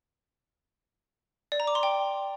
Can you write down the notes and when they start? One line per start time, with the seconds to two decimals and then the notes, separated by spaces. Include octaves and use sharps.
1.52 D5
1.60 A#5
1.67 D6
1.75 C6
1.83 G5